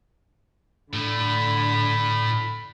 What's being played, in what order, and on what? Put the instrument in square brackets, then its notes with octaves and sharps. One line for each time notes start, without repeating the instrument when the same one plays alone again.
[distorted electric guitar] A2 A3 [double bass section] D3 [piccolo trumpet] B5